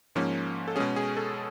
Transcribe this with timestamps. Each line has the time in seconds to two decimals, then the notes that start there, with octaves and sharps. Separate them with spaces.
0.15 G#2 F3 A#3 C#4
0.68 A4
0.76 B2 G#3 C#4 G#4
0.96 G#4
1.17 A4